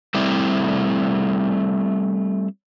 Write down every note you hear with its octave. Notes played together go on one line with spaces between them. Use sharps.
G3 A3 C4 E4